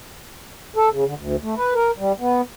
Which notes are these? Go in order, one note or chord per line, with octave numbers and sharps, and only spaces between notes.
A4
C#3
D3
D2
A3
B4
A#4
G3
B3